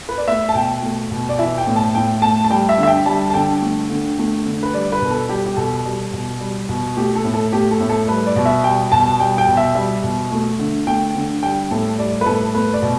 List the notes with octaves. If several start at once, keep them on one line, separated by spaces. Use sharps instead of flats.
B4
D5
A3 E5
A5
B2 G5
A3
B2
D5
E3 E5
G5
A2
A5
A2 G5
A3 A5
A5
G3 G5
E5
D3
E5
G5
G3 A5
A5
D3 G5
A3
D3
A3
D3
B4
G3 D5
B4
B2
A4
G3 G4
G4
B2 A4
G3
B2
G3
B2
A3 G4
A4
A2
A4
A3 G4
A4
A2
A4
G3 B4
D5
B2
E5
G3 G5
B2 A5
G3 G5
G5
B2
E5
G3 E5
B2
A3
D3
A3 G5
D3
G3 G5
A2 A4
G3 D5
B4
A2 A4
A3 B4
D5
B2